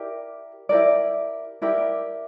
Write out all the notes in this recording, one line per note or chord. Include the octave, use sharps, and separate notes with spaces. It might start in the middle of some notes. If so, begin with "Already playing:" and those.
Already playing: E4 G4 A#4 D5
E4 G4 A#4 D5
E4 G4 A#4 D5